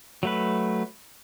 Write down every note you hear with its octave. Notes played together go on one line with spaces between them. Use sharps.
F#3 A3 B4